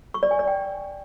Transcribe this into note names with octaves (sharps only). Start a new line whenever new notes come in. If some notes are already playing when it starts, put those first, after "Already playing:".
C#6
D5
G#5
D5
G5